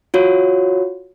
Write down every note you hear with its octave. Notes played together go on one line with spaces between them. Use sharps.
F4 F#4 C#5